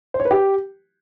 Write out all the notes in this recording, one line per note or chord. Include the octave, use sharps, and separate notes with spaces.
C5
C#5
B4
G4